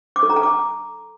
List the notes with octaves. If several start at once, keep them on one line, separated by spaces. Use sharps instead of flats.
D6
A4
A#5
A5
D6